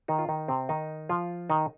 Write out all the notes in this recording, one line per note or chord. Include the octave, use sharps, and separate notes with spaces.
D#3 D#4
F4
D#3 D#4
C3 C4
D#3 D#4
F3 F4
D#3 D#4